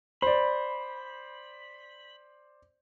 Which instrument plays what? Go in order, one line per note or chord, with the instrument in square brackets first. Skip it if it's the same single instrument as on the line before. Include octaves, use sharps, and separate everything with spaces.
[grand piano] C5 D5 [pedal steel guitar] B5